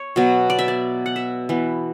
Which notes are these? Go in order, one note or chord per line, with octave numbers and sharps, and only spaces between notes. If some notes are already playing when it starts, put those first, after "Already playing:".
Already playing: C#5
B2 F#3 B3
D5
E5
D5
F#5
E5
E3 B3